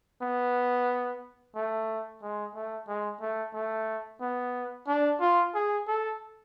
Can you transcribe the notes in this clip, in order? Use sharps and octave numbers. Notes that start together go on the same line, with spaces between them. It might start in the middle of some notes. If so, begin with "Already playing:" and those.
B3
A3
G#3
A3
G#3
A3
A3
B3
D4
F4
G#4
A4